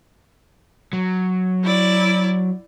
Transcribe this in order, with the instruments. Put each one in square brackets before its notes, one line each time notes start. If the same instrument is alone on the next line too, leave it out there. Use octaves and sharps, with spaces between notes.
[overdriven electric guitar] F#3
[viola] E4 D5